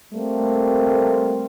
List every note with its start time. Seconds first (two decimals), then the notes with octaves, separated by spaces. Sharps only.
0.13 G3 A3 A#3 C4